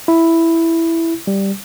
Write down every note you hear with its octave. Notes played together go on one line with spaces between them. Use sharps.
E4
G3